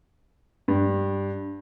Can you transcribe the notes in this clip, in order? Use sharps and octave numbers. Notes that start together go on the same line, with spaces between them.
G2